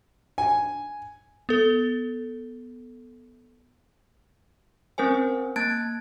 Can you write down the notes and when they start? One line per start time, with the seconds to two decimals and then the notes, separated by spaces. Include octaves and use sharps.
0.38 G#5
1.49 B3 A4
4.98 C4 C#4 A#4 C5 G#5
5.56 A#3 A5 F#6 G#6 A6 D7